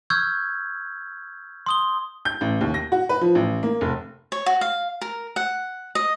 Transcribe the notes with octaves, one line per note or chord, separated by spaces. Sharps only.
C#6 E6 F6 G6 G#6
C6 D#6 G7
G6
A1
D#2
A#6
F#4
B4
F3
A1
A#3
F1
C#5
F#4
F5
A#4
F#5
D#5